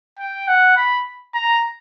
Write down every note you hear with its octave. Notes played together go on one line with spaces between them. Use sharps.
G5
F#5
B5
A#5